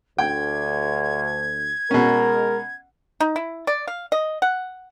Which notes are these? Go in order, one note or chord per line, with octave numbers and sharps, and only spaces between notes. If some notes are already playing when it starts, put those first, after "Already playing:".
D2 G5 G#6
B2 G#3 C#4 A#4
D#4
E4
D5
F5
D#5
F#5